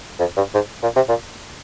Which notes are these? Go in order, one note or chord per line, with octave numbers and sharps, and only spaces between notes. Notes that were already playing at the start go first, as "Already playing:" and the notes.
F2
G2
G#2
A#2
C3
A#2